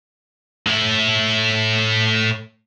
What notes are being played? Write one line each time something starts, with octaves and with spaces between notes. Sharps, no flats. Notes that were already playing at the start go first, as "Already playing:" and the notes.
A2 E4